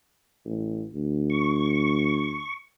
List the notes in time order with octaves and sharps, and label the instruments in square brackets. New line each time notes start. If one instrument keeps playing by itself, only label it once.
[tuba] A1
D2
[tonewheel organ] C#6